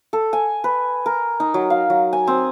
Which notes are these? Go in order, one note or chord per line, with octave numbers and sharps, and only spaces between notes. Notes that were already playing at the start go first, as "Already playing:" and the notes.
A4
G#5
B4
A#4
D#4
F#3
F5
F#3
G#5
C4